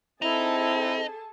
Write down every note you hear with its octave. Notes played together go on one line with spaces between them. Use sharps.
C4 D#4 E4 G#4 A4 A5